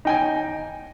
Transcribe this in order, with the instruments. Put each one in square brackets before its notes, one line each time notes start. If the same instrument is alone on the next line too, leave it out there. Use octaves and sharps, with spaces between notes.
[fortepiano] D#4 G5 G#5